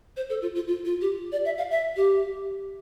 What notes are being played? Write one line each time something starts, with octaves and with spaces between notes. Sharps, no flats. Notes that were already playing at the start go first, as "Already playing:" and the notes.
C5
A4
F4
F4
F4
F4
G4
D5
E5
F5
E5
G4